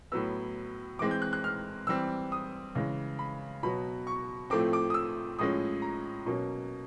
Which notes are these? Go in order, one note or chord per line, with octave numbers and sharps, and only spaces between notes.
A2 F#3 B3 E6
E3 G#3 C4 D6
G6
F#6
F#6
F6
E3 G3 C4 E6
D#6
C#3 E3 G#3
B5
B2 F#3 B3 B5
C#6
A2 F3 A3 C4 D6
D6
D#6
E6
A2 F3 G#3 C#4 D#6
A#5
B2 F#3 A#3 C#4